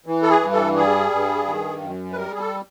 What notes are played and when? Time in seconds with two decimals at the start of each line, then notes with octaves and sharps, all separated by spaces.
0.06 E3
0.22 A4
0.30 G#4
0.41 G2
0.52 A4
0.76 G3 G#4
1.11 G2
1.47 D#3
1.81 F#2
2.12 B4
2.16 G3 A#4
2.32 G#4
2.39 A4